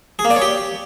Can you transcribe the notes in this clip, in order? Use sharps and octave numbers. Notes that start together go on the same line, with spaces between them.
G#4
A#3
D5
C#5
G4